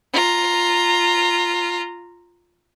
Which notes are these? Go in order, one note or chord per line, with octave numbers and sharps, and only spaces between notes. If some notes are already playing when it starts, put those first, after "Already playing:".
F4 A#5